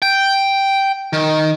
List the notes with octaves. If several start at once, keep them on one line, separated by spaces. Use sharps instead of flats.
G5
D#3